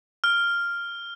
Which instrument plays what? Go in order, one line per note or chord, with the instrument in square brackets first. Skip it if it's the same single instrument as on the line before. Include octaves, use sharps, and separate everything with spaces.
[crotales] F6